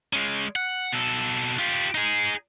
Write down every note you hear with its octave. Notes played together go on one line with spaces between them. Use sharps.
G#3 C#4
F#5
B2 A4
F4 G4
D#4 G#4